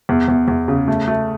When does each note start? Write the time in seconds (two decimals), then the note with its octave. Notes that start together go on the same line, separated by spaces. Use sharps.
0.09 E2
0.28 E2
0.48 E2
0.68 C#3
0.88 A3
1.08 A3